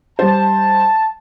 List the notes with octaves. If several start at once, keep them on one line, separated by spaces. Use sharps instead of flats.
G3 C5 A5